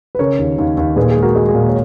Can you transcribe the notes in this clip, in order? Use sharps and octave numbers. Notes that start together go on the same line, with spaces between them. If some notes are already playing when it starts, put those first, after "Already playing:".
B4
C#3 A#4 C#5
D#2
D#2
D#2
A#2 G#4 B4
G#4
G#3
F#4 A#4
G#3
G#4
A#2
C#5